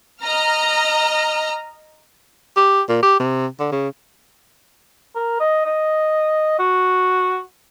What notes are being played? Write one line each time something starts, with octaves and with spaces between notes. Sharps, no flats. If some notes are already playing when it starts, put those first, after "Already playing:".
D#5 A#5 F6
G4
A#2
G4
C3
D3
C#3
A#4
D#5
D#5
F#4